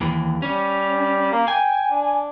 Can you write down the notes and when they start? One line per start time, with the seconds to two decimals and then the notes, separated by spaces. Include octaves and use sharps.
0.01 D#2 E3
0.42 G3 C#4
1.32 A#3
1.48 G5 G#5
1.90 D4